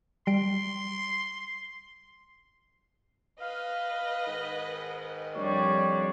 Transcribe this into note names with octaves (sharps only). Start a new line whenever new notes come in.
G3 C6 D7
B4 D#5 F5
G#2 D#3
F2 G3 D4 C#5